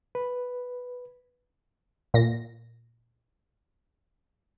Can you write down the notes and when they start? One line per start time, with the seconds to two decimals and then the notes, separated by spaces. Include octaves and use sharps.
0.15 B4
2.14 A#2 A#6